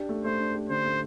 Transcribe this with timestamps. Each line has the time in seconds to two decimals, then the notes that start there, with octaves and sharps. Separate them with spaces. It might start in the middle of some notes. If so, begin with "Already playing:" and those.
Already playing: D4 G4
0.09 A3
0.24 A3 C5
0.39 D4
0.55 G4
0.69 D3 C5
0.85 A3